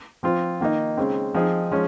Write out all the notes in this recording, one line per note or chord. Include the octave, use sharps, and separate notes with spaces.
F3 C4 F4 C5
D#3 A#3 D#4
C#3 G#3 C4
F3 C4 D#4 G#4
F3 G#3 C#4